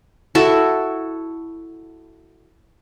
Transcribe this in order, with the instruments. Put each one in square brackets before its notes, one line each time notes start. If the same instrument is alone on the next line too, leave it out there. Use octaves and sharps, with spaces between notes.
[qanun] E4 F#4 A4 E5